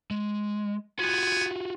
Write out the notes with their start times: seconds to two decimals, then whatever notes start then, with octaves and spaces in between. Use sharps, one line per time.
0.11 G#3
0.99 B3 F4 F#4 G#5